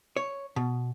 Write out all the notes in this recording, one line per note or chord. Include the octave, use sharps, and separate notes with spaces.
C#5
B2